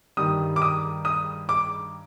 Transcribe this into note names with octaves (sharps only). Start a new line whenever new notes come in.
G2 D#3 G3 D#6
D6
D#6
D#6
D6